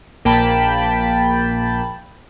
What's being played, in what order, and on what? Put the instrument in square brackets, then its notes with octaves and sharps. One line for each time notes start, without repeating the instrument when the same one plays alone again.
[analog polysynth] A#1 A#3 G5 A5 B5